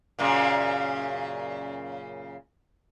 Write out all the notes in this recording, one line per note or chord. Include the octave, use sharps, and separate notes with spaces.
F#2 A#2 C#3